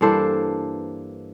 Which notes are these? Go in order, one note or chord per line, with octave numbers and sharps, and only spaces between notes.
G2 E3 A#3 D4 A4 C5